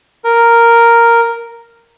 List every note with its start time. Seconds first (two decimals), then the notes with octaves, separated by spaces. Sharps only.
0.24 A#4